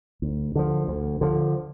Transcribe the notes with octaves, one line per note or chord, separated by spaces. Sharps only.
D2
D3 F3
D2
D3 F3